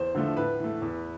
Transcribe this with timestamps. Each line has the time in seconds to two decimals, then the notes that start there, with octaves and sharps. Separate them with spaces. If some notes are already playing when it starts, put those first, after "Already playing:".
Already playing: E2 C5
0.15 D3 F3 A3
0.37 A2 B4
0.60 E3 A3
0.82 E2